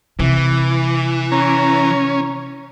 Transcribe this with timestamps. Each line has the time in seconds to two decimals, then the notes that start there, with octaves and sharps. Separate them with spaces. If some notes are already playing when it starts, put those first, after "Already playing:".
0.20 C3 E3
1.32 C#4 A#5